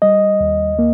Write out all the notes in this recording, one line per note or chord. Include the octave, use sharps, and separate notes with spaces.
G3 D#5
D#2
A#3